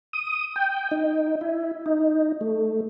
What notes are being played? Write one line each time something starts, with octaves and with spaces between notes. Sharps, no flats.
D#6
G5
D#4
E4
D#4
A3